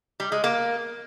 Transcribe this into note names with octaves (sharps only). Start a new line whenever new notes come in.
G3
G#3
A#3